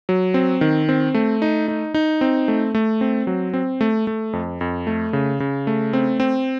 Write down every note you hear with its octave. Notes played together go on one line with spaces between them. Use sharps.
F#3
C4
D#3
C4
A3
D#4
D#4
D#4
C4
A3
A3
C4
F#3
C4
A3
A3
F2
F2
A3
C#3
C#3
A3
C4
C4